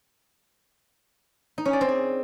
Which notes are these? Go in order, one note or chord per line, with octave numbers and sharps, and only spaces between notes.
D#4
C#4
D5
C4
G#4